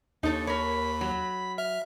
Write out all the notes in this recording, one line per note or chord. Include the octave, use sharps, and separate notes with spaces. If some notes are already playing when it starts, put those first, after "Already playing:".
D#2 D#4 A4 C#5
A#4 C#5 B5
F#3
E5 F6